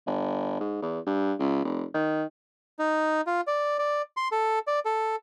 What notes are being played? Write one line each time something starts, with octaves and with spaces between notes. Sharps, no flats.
G1
G#2
E2
G2
C#2
F1
D#3
D#4
F4
D5
D5
C6
A4
D5
A4